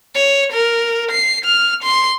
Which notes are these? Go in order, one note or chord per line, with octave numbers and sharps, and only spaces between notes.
C#5
A#4
C7
F6
C6